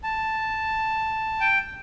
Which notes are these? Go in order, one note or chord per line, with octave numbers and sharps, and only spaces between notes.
A5
G5